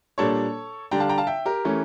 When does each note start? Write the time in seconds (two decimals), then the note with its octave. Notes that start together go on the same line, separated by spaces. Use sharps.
0.18 A#2 G3 A#3 D4 A4 C#5
0.91 D3 G3 D4 G5 A#5
1.00 F5 A5
1.09 G5 A#5
1.18 F5 A5
1.27 E5 G5
1.45 G4 A#4
1.65 E3 A3 C#4